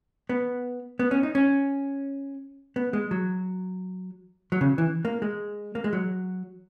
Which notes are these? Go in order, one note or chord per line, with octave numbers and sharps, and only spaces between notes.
B3
B3
C#4
D#4
C#4
B3
G#3
F#3
F#3
C#3
E3
A#3
G#3
A#3
G#3
F#3